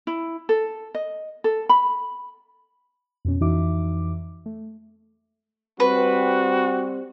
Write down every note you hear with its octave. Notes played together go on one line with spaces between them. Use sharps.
E4
A4
D#5
A4
B5
F2 B2 C#4
F2 E3 D#4 F#4 E5 D6
A3
G3 C4 F#4 B4